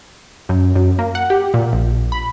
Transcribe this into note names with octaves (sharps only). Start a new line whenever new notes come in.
F#2
F#2
A#3
F#5
G4
A#2
A#1
B5